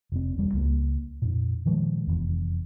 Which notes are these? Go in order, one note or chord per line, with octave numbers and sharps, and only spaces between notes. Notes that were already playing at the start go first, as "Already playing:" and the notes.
F1 C4
E1 G3
C#2 A#3
F2 A#2
A#2 D#3 F3 G#3
F1 E2